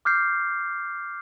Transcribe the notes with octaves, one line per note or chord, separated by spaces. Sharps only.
D6 F6 G6 C7